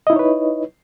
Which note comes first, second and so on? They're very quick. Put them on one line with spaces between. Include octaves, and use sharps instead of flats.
D#5 E4 D#4 C#5 B4